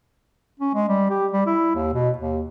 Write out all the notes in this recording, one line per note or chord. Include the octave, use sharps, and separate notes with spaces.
C#4
G#3
G3
G4
G3
E4
D#2
B2
D#2